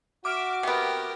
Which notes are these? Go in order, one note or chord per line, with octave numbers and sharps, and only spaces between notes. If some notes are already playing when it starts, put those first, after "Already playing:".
F#4 E5 D6 F6 D7
C3 B3 G4 A#4